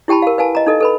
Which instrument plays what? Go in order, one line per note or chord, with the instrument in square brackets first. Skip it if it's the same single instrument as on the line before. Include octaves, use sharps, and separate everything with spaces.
[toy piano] E4 G4 G5 A5 B5
A#4 F5
B4 F5 G#5 A5
D#5 A#5
D#4 A4 D#5
A4 B4 B5